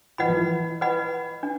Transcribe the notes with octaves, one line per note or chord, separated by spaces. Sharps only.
E3 B4 D#5 F#5 B5
F3
E3
B4 D#5 F#5 B5
D4